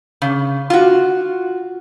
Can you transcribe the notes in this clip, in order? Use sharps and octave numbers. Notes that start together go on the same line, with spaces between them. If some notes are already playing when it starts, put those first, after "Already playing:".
C#3
F4 F#4